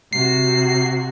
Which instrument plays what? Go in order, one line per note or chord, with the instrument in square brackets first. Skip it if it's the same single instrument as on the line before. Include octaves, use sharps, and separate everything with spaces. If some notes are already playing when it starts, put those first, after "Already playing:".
[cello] C3 F#4 [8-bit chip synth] C7